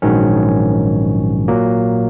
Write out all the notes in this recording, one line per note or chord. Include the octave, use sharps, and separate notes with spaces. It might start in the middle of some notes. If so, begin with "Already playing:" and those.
A#1 G#2 D#3 F#3 C#4
A#2 F#3 A#3